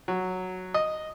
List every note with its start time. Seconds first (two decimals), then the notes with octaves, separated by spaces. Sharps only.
0.08 F#3
0.74 D#5